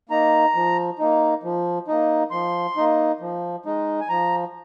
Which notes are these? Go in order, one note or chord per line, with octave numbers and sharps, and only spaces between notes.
A#3 D#4 A#5
F3
A#3 D#4
F3
A#3 D#4
F3 C6
A#3 D#4
F3
G#3 D#4
G#5
F3 A#5